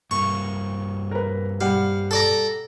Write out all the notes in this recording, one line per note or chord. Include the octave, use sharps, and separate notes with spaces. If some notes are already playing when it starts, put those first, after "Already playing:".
G2 A#3 C#6
A#4 B4
G3 F5 F#5
A4 D5 A#5